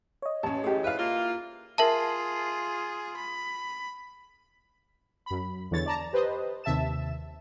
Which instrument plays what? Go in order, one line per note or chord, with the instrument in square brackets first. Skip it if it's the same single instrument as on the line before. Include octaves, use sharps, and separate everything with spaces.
[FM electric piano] C#5 D#5
[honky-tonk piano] A1 C#4 [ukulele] A5
[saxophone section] F#2 A2 [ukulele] G4 G#4
[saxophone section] G#2 E3 B4 [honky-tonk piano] E4 F5
[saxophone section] A#3 F4
[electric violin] F4 G#4 [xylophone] A#4 E5 A5
[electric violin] B5
[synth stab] F#2 B5
E2 D3 E3 C#5 A6
D5 A5 A#5
G4 B4 C5 D#5
D#2 C3 E5 A5 E7